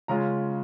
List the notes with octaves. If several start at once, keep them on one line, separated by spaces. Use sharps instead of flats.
C#3 G#3 C#4 F4 A#5